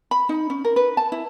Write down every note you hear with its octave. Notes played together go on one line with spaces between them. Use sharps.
B5
D#4
C#4
A#4
B4
A5
E4